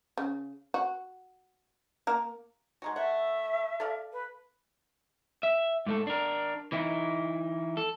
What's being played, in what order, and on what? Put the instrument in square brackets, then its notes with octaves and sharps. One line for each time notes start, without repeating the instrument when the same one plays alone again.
[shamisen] C#3
F#4
A#3 A#4
[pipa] G#3 D#4 F#4
[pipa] A3 F#5 [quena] E5
[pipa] A4 D5 F5
[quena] B4
[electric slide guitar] E5
G#2 A3 A4
D4 A#4
E3 D#4 E4
A4